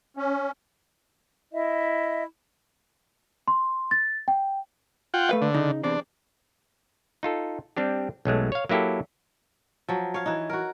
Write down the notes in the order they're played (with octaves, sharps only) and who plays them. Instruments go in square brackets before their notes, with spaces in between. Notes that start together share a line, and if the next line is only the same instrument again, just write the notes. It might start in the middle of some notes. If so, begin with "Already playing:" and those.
[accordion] C#4
[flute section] E4 D#5 E5
[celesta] C6
A6
G5
[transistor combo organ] F4 F#5 G5
[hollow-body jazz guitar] A3 B4 F5
[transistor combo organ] D3
[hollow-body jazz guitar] C#3 D#4
[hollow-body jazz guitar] E2 C3 C4 [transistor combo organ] D4
[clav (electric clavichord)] D#4 F4 A4
G3 C4 D4 G4
B1 F#3 G#3 A3
C#5 F5
F#3 A#3 E4 G4 A4
[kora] F3 F#3
C#5 F5
E3 D#4
F#4 A#4